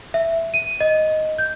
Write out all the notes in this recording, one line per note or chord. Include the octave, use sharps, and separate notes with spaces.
E5
D#7
D#5
G6